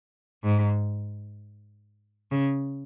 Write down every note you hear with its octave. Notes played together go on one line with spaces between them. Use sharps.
G#2
C#3